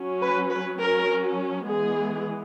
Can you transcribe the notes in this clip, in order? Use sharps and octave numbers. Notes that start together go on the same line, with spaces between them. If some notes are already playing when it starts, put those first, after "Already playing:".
Already playing: F#3 C#4
B4
B4
F#3 C#4 A#4
E3 G#3 B3 G#4